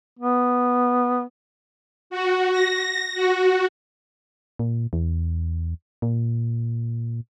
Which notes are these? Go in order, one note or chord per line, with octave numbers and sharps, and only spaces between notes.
B3
F#4
A#6
F#4
A#2
E2
A#2